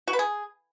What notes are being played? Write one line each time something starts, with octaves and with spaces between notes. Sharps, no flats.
F#4
B4
G#4